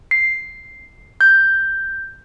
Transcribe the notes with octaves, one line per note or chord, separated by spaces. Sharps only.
C7
G6